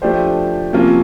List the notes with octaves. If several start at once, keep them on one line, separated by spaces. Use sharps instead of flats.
F3 A3 D4 G4 C5
C3 F3 A#3 C#4 F4